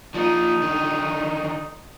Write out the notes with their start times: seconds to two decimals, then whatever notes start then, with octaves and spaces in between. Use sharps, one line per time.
0.14 F3 A#3 D#4
0.62 D3 D#3